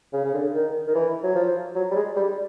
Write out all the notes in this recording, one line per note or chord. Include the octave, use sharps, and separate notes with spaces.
C#3
C#3
D3
D#3
D#3
E3
F#3
F3
F#3
G3
G#3
G3